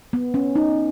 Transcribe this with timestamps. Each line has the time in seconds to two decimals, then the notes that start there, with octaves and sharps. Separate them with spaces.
0.13 B3
0.34 C#4
0.55 D#4